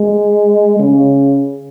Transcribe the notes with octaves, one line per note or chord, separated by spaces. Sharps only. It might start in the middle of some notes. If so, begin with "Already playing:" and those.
Already playing: G#3
C#3